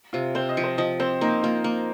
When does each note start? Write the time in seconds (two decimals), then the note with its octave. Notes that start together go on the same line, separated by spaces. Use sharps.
0.13 C3 F4
0.35 C4 C5
0.49 D#5
0.57 F3
0.64 C5
0.78 F3 D#5
1.00 C4 C5
1.21 A#3 D#4
1.43 A#3 F4
1.64 A#3